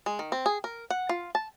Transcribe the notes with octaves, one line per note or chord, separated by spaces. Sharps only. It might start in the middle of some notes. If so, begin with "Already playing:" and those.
G#3
D#3
C4
G#4
A#4
F#5
F4
A5